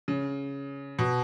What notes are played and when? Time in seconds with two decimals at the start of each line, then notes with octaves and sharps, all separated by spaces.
0.08 C#3
0.99 B2